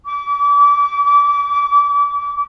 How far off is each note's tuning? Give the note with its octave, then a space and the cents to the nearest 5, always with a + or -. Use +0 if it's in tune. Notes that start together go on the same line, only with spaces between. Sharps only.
D6 -35